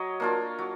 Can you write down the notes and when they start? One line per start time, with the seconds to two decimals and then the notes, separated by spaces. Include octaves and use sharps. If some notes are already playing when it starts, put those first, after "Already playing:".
Already playing: F#3 C#5 D#5
0.20 A#3 D4 F4
0.59 F#3